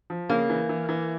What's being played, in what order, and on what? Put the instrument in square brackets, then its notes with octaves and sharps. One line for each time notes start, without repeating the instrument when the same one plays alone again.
[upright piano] F3
[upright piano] C#3 [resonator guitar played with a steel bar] A#3
[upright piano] E3
E3
E3